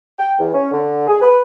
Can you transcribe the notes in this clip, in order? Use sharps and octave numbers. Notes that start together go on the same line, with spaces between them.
G5
E2
C#4
D3
G#4
B4